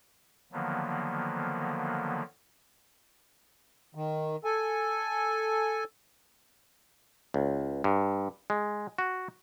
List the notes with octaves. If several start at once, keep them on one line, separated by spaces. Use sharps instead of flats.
D3 D#3 F3 F#3 A#3 B3
D#3
A4 G#5
C#2
G2
G#3
F#4